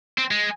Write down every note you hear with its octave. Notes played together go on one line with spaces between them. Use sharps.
C4
G#3